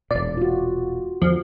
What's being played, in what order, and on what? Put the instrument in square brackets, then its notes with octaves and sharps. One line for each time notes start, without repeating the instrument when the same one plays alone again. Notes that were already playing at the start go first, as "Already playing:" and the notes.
[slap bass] E1 A#2 [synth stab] D5
[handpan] F4 F#4
[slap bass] E2 D3 [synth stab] F3